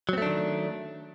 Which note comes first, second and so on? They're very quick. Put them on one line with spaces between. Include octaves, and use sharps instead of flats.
F#3 C4 A3 D4 D#3